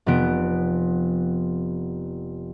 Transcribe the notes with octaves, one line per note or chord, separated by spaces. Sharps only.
F1 F3 B3 D7